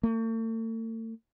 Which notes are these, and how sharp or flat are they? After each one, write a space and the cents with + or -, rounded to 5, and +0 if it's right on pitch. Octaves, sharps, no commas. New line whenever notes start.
A3 +45